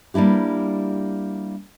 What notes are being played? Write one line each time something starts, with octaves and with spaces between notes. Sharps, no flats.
G3 A#3 D4 E4 G4